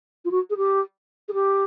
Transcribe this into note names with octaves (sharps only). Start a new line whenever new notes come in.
F4
F#4
G#4
G4
G#4
G4